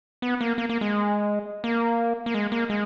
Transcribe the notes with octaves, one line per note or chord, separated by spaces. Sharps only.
B3
A#3
A#3
A#3
G#3
A#3
A#3
G#3
A#3
G#3